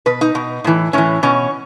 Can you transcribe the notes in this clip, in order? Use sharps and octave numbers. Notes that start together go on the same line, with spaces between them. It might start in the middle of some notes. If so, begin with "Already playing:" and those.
B2 B4
D#4
B2
A2 E3
A2 E3 C#4
B2 C#4